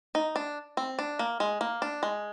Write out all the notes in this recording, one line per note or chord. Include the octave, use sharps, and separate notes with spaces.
D#4
D4
C4
D4
A#3
G#3
A#3
D4
G#3